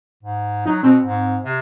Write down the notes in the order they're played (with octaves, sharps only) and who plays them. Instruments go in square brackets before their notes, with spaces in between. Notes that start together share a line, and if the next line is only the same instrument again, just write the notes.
[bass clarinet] G#2
[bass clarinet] F#3 [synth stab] D#4
[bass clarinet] B2 [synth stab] C4
[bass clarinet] G#2
C3